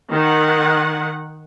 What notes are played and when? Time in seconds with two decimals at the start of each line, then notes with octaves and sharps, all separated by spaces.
0.11 D#3 F#5